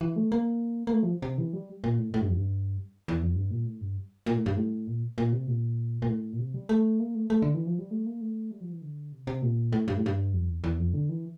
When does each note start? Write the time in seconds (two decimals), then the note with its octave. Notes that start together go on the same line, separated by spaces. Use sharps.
0.01 E3
0.16 A3
0.32 A#3
0.87 A#3
0.93 A3
1.03 F3
1.22 C3
1.38 E3
1.53 G3
1.84 A#2
1.98 A2
2.14 A2
2.21 G2
2.29 F2
2.37 G2
3.08 E2
3.22 F2
3.35 G2
3.51 A#2
3.65 A2
3.81 G2
4.26 A#2
4.36 A2
4.46 G2
4.57 A2
4.87 A#2
5.18 A#2
5.33 C3
5.47 A#2
6.02 A#2
6.08 A2
6.33 A#2
6.39 C3
6.54 G3
6.69 A3
6.99 A#3
7.15 A3
7.30 A3
7.42 D3
7.54 E3
7.66 F3
7.79 G3
7.91 A3
8.06 A#3
8.21 A3
8.51 G3
8.61 F3
8.72 E3
8.82 D3
9.12 C3
9.27 C3
9.42 A#2
9.72 A2
9.88 G2
9.97 A2
10.06 G2
10.33 F2
10.49 E2
10.64 E2
10.79 F2
10.94 D3
11.09 E3